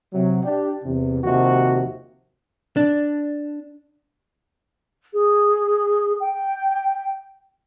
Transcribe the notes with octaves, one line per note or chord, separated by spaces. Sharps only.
C3 F#3
D4 G4
E2 C3
D#2 C3 F3 F#4
D4
G#4
G5